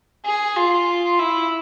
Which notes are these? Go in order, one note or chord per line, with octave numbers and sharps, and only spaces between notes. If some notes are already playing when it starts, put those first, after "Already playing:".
G#4
F4
E4